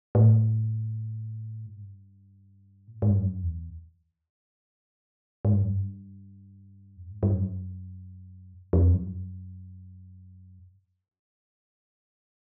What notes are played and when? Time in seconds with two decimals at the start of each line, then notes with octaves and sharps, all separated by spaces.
0.15 A2
1.66 G2
1.73 G#2
1.80 G2
2.88 A#2
2.95 A2
3.02 G#2
3.10 G2
3.18 F#2
3.43 E2
5.45 G#2
5.53 G2
5.62 F#2
5.71 G2
6.97 F2
7.11 G#2
7.23 G2
7.34 F#2
8.73 F2
8.94 G2
8.99 F#2